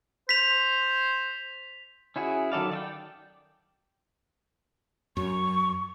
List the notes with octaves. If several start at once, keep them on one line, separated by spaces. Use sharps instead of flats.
C5 B6 F7
C#4 E4 F#4 G#4
D#3 F#3 A4 D5 F5
D5 E5 G5
F#2 C#6